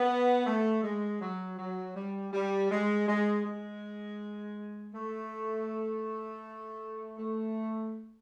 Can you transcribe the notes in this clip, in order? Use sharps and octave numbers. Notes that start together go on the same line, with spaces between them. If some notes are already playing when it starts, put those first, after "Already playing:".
Already playing: B3
A3
G#3
F#3
F#3
G3
G3
G#3
G#3
G#3
A3
A3